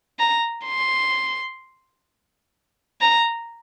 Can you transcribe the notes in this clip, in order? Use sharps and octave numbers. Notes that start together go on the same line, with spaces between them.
A#5
C6
A#5